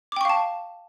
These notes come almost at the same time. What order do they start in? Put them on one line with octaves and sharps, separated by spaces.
D6 G5 C#6 F5 A5